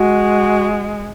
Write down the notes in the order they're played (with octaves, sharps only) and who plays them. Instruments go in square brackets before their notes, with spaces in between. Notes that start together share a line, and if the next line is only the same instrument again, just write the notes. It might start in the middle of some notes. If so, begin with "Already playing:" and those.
Already playing: [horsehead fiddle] G#3 [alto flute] F#4